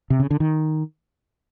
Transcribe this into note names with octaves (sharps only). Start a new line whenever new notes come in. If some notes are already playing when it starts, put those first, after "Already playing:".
C3
C#3
D3
D#3